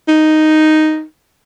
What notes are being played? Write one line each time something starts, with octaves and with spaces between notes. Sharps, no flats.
D#4